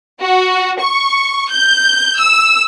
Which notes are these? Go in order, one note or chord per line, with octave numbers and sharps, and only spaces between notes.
F#4
C#6
G6
E6